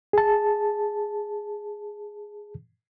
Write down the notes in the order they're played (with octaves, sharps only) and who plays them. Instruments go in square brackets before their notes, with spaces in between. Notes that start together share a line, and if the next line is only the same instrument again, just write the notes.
[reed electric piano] G#4 A5